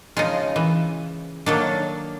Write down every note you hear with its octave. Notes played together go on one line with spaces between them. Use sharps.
C#3 F3 G#3 D#4 F4
E3
D#3 F#3 A#3 D4 A4